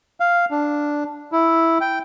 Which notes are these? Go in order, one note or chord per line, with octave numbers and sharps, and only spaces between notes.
F5
D4
E4
G5